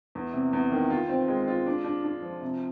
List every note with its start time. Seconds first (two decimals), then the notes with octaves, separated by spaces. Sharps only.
0.15 E2
0.34 C3
0.53 E2
0.72 D#3
0.90 F4
1.09 C4
1.28 G#3
1.48 F4
1.66 D4
1.84 D4
2.04 D4
2.22 F3
2.42 C3